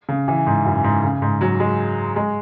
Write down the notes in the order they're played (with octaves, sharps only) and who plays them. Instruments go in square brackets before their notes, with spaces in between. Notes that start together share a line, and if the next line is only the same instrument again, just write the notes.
[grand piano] C#3
E3
G#2
F#2
G#2
C#3
G#2
F#3
G#3
G#3